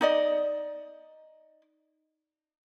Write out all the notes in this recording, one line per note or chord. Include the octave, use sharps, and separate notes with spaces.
D#4 D5 D#5